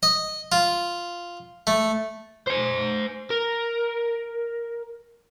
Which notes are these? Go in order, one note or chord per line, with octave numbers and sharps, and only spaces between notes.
D#5
F4
A3
C5 G#5
A#4